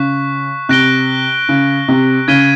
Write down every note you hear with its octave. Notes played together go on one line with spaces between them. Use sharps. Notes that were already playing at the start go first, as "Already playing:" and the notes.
Already playing: C#3 C#6 F#6 B6
C3 F#6 A#6 D7 G7
C#3
C3
C#3 G#6 B6 D#7 G7